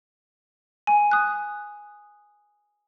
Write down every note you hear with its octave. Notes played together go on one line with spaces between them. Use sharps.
G#5
D#6 F#6